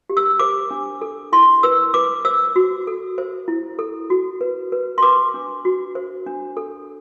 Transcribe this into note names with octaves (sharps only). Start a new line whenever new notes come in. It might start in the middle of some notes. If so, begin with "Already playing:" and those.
G4
E6
C5 D6
D4
A4
E4 C6
B4 E6
B4 D6
C5 E6
F#4
A4
C5
E4
A4
F#4
B4
B4
C6
B4 D6
D4
F#4
C5
D4
A4